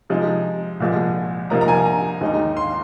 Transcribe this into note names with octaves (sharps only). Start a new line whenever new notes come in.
C3 F3 G#3 D#4
C2 A#2 F3 G#3
C2 C3 F3 A#3 D#4 A#5
A#5
G#5
A#5
D#2 D#3 G#3 D#4
C6